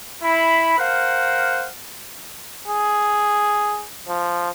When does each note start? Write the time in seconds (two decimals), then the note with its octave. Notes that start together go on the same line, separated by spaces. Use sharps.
0.23 E4 B5
0.79 A#4 C5 F5 F#5
2.68 G#4
4.08 F3